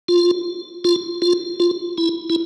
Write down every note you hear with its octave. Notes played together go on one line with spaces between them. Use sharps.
F4
F4
F4
F4
E4
E4